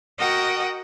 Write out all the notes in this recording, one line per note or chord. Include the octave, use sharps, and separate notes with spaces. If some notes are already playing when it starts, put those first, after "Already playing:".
F#4 A#4 D#5 F#5 G5